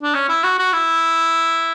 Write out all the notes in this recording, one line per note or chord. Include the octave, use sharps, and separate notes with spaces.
D4
C#4
E4
F#4
F#4
E4